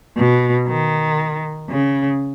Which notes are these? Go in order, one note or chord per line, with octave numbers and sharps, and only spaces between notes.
B2
D#3
C#3